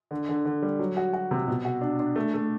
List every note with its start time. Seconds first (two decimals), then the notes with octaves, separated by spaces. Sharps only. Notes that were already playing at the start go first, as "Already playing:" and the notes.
0.11 D3
0.29 D3
0.45 D3
0.62 G3
0.79 F#3
0.97 F#4
1.13 F#4
1.31 C3
1.48 B2
1.65 F#4
1.81 D4
2.00 D4
2.16 A3
2.34 A3